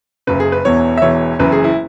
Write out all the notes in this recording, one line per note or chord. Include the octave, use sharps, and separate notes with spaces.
F#1 F#2 C#3 B4
G#4
B4
E1 E2 E3 C#5
E5
E1 E2 E3 C#5
F#1 F#2 E3 B4
G#4
E4